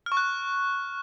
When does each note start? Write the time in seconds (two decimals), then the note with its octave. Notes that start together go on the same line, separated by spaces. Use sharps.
0.06 F6
0.12 C#6
0.17 F#6